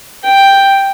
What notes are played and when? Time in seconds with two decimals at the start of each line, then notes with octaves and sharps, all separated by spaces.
0.24 G5